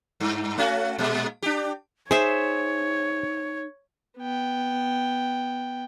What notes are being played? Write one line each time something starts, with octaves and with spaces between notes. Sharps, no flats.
G2
A3 C#4 F#4
A#2 G#3
D4 G4
D#4 G#4 C5 C#5 E5
B3 G5